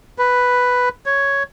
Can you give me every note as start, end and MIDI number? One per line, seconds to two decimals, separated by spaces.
0.18 0.89 71
1.06 1.43 73